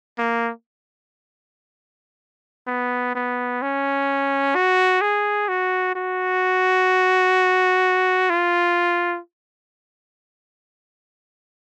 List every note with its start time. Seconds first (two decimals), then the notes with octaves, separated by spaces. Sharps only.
0.18 A#3
2.67 B3
3.15 B3
3.62 C#4
4.55 F#4
5.01 G#4
5.49 F#4
5.95 F#4
8.30 F4